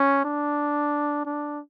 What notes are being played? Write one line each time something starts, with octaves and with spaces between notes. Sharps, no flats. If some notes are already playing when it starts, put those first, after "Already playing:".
Already playing: C#4
D4
D4